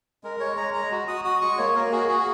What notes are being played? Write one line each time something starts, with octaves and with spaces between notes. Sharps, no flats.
G#3 A#4
G#3 C#5
G#3 A#5
G#3 A#5
F#4
F#4 D#6
F#4 D#6
G#3 C#6
A#3 C#5
A#3 A#4
F#4 G#4
F#4 G#4